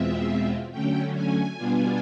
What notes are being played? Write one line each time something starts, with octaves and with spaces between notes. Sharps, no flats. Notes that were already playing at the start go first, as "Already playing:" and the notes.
Already playing: E2 B2 G#3 C4 F4 E5
D3 F#3 A3 C#4 G5
G#5
B2 G3 B3 D4 F4